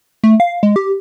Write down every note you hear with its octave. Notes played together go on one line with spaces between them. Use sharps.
A3
F5
G#3
G4